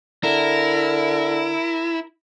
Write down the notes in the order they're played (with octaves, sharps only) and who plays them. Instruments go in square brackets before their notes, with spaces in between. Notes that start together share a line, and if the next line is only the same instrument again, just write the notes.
[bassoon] D3 [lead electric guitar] E4 [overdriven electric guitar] A#4